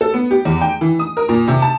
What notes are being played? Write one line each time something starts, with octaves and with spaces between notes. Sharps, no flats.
A4
B3
G4
E2
G5
E3
D#6
A#4
A#2
C3
A5